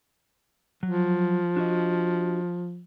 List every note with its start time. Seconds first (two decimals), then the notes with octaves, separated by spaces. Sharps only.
0.83 F3 F#3
1.56 D4 F#4 D#5